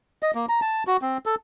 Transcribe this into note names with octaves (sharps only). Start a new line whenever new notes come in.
D#5
A#3
A#5
A5
F#4
C4
A4